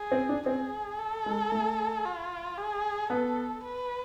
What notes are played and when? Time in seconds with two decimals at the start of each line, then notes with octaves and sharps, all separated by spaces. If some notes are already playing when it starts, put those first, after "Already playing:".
Already playing: G#4
0.11 C4
0.29 D4
0.46 C4 G#4
0.98 A4
1.26 G#3
1.52 A3
2.05 F4
2.58 G#4
3.10 B3 A4
3.63 B4